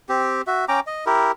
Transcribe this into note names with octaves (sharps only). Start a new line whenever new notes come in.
C4 G4
F#4 E5
C#4 G5 A#5 D6
D#5
E4 G4 A#4